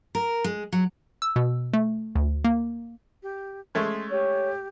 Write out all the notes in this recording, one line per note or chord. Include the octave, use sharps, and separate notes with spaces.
A#4
G#3
F#3
E6
B2
A3
D2
A#3
G4
G#3 A3 C#4 C6
G4 C#5